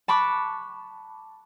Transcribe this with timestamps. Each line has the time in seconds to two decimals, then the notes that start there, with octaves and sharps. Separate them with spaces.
0.08 A5 B5 C#6 D6 F#6